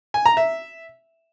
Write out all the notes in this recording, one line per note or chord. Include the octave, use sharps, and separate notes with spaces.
G#5
A#5
E5